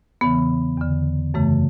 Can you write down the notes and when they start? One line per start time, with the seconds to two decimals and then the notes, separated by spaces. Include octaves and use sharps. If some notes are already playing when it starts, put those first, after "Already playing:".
0.21 E2 C#3 E3 B3
0.78 E2 D3
1.34 F#2 C#3 E3 A3